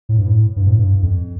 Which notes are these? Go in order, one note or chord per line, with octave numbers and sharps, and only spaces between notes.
A2
G2
A2
G2
A2
G2
F2